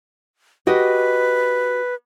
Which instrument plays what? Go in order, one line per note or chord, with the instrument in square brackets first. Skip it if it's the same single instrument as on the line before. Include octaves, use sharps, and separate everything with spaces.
[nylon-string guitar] F#4 G4 D#5 [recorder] B4